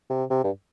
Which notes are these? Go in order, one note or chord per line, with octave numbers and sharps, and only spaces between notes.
C3
C3
G2